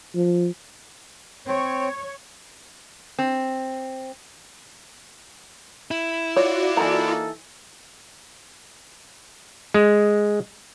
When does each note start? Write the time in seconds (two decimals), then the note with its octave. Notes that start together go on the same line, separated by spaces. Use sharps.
0.15 F3
1.47 C4 C#5
3.19 C4
5.91 E4
6.36 F4 F#4 C#5 D5
6.77 E3 A#3 D#4 A4 A#5
9.74 G#3